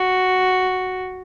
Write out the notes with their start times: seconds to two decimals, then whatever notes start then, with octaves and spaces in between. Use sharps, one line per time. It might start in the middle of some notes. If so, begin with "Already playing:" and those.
Already playing: F#4